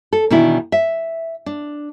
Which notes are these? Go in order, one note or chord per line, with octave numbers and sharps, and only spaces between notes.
A4
B2 D#3 E3 D4 E4
E5
D4